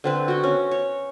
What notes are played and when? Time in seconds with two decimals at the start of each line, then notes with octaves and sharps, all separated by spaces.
0.04 D3 C4 B4
0.28 F#4 G5
0.44 C#4
0.71 C#5